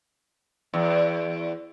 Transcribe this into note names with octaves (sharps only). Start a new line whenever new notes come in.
E2